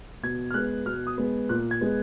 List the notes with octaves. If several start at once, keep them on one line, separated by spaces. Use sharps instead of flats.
B2 G#6
F6
G#3 B3 F#6
B2 F6
D#6
G#3 B3
A#2 F#6
G#6
G#3 B3